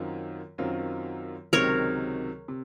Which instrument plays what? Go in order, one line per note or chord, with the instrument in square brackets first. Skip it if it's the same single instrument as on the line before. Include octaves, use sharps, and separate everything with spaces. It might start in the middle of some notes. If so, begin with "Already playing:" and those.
Already playing: [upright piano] F#2 D#3 F#3 C4 F4
F#2 D#3 F#3 C4 F4
[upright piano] C#2 C3 D#3 F#3 C4 [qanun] A#4 C#5
[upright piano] C3